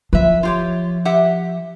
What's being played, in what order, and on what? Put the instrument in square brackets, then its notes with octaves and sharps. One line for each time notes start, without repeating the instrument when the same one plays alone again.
[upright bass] F3 [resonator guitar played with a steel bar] B4 E5
[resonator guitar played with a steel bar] F4 G4 C#5
G4 E5 F#5